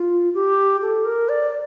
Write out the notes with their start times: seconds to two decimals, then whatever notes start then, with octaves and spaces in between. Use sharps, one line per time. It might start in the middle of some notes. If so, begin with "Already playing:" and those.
Already playing: F4
0.34 G4
0.82 A4
1.05 A#4
1.29 D5